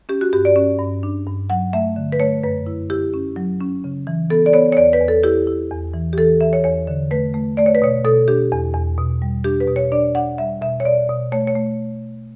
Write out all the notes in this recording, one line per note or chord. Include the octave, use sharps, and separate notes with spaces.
C#4 G4
F#4
G2 G4
D5
C#4
G2
D4
G2
F#3 F#5
A3 E5
D3
B4
A3 C#5
F#2 B4
E4
E4 G4
C#4
F#3
C#4
C#3
E3
B3 A4
D5
B3 C#5
C#5
E2 D5
B4
E2
A4
E4 G4
E4
E2
E3
G4
E3 A4
E3 E5
C#5
E2 C#5
D3
A3 B4
A3
A3 D5
C#5
B4
B2 C#5
B2 A4
D4 G4
E2
E2
B2
G3
D4 G4
B4
B2
C#5
D4 D5
D4 F#5
G3 E5
B2 E5
C#5
B2 D5
B2
A3 C#5
C#5
A3